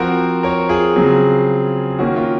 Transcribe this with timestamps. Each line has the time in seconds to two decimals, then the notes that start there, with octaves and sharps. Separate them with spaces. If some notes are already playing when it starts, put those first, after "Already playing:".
Already playing: F3 C4 F#4 A#4
0.43 A#4 C#5
0.69 F4 G#4
0.96 C#3 F#3 C4
1.99 D#3 A#3 C#4 F#4
2.16 F4